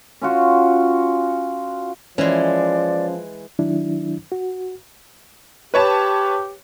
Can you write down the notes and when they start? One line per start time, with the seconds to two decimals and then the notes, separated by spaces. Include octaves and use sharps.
0.21 C#4 F4 F#4
2.18 E3 F3 G#3 C#4 D5
3.59 D#3 F#3 D4 E4
4.32 F#4
5.74 G4 B4 C#5 A5